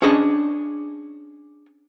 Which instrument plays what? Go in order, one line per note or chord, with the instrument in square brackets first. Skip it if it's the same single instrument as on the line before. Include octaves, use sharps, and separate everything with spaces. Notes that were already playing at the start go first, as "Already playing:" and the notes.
[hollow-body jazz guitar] C#4 D4 G#4 D#5 A5